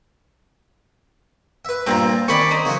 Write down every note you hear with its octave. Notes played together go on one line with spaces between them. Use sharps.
B4 E5
G2 A#2 C4 F4 A#5
C3 D#3 C#4 D5 B5 C#6
D#4 C5
C#3 F#3 E4